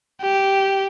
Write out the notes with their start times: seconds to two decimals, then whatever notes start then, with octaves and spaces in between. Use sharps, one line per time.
0.22 G4